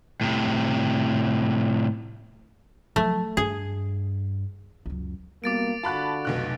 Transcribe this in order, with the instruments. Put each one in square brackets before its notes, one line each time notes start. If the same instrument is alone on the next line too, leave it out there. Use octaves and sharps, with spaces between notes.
[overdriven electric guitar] A2 C3
[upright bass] F3 F#3 [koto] A3
[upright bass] G2 [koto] G#4
[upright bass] C#2 F#2
[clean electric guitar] C2 G2 B2 [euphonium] A#3 [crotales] D6 A6 D7
[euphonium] D3 [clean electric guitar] F4 F#4 [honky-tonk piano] A5 B5 F#6
[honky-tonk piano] F1 B1 F#6